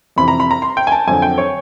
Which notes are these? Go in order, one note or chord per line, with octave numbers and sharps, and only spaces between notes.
F2 C3 E3 B5
A#5
B5
A#5
C6
G5
G#5
A5
F2 D3 F#3 G#5
G5
C#5